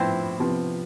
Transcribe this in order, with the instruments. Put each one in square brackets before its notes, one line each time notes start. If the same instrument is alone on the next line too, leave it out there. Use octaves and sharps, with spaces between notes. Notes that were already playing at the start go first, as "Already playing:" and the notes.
Already playing: [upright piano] A2 F3 B3 [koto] C4 D4 E4
[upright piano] C3 F3 B3